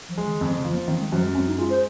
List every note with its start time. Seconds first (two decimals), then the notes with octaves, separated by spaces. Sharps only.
0.09 F3
0.18 G#3
0.26 D#3
0.41 F2 D#3
0.56 C#3
0.64 F3
0.73 A#3
0.88 D#3 C4
1.00 G#3
1.11 F#2 F3
1.23 G#3
1.35 F#2 C4
1.47 D#4
1.58 G#3 F4
1.70 C5